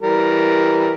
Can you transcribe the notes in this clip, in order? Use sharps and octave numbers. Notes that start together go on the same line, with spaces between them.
E3 G3 A#4